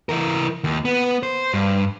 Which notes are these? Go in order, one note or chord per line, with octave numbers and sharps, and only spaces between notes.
E3 A#4
D#2
B3
C5
G2